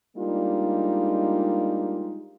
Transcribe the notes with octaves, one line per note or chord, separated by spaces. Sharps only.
G3 G#3 A#3 D4 D#4 F4